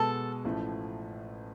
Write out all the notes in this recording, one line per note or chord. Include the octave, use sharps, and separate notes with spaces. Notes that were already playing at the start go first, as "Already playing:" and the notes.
Already playing: B2 G#3 B3 A4
A1 A2 F3 A3